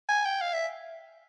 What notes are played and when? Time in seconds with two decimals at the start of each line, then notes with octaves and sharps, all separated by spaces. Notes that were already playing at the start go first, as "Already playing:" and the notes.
0.09 G#5
0.25 G5
0.41 F5
0.53 E5